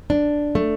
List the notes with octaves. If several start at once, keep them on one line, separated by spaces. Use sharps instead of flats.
D4
A3